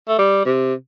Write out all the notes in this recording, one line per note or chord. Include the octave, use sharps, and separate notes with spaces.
A3
G3
C3